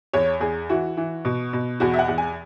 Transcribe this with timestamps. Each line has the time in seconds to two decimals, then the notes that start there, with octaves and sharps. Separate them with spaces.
0.13 E2 C#5
0.41 E2 G#4
0.69 E3 F#4
0.97 E3
1.25 B2
1.53 B2
1.80 E2 F#4
1.94 E5
1.99 F#5
2.08 E2
2.18 G#5